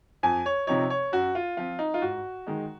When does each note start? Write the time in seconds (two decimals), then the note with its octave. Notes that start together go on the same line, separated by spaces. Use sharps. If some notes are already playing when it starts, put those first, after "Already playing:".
0.23 F2 G#5
0.46 C#5
0.67 C3 F3 C4 D#4 C#5
0.90 C#5
1.12 F#2 F#4
1.35 F4
1.57 F3 C4 F4
1.79 D#4
1.94 F4
2.02 G#2 F#4
2.47 D#3 G#3 D#4